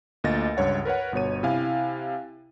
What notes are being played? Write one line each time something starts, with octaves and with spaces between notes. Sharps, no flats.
D2 A#2 A#3 D#5 A6 A#6
C#2 G2 C#5 F#5
A#4 B4 C#5 F#5
G1 B2 C#5 D#7
C3 E4 F5 G#5